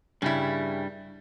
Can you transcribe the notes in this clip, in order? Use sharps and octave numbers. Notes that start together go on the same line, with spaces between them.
G2 C#3 G3 E4